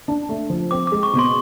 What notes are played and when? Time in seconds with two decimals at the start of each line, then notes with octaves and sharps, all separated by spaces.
0.08 D4
0.29 A3
0.50 F3
0.71 C4 D6
0.87 D6
0.92 G#3
1.03 C#6
1.13 B2
1.19 C6